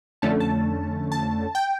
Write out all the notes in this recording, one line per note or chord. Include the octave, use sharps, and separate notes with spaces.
F2 D3 A3 C#4 A5
A5
A5
G5